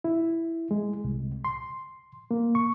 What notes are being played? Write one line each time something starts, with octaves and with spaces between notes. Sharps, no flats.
E4
G#3
C2
C6
A#3
C#6